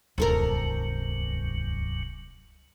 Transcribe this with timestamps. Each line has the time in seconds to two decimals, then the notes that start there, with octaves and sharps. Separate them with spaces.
0.18 D#1 C#2 G2 C3 F#3 D#4 A4 A#4